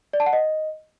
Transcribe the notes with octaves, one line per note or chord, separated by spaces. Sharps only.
D5
A5
F#5
D#5